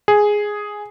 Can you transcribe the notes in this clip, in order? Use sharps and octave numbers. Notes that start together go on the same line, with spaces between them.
G#4